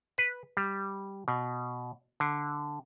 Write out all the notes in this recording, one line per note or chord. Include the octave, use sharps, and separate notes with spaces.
B4
G3
B2
D3